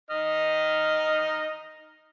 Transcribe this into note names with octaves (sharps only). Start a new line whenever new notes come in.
D#4 D#5 F6